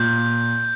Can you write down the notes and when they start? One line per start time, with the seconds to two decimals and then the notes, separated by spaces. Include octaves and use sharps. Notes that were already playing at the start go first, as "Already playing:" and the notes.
Already playing: A#2 G6